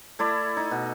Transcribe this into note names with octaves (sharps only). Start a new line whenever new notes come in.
A3 E4 D5
D#4
B2